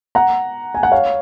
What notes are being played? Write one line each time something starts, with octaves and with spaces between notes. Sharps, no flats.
F#5 A#5
G#5
F#5
C#5 F5